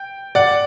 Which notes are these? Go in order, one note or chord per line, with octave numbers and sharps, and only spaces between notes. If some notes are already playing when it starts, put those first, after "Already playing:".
Already playing: G5
D5 F#5